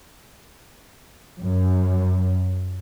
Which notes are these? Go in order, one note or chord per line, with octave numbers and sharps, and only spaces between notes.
F#2